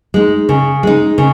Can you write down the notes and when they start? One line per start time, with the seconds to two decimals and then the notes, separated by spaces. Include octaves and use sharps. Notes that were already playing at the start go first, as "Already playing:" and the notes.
0.14 G#3 D#4
0.49 C#3
0.83 G#3 D#4
1.18 C#3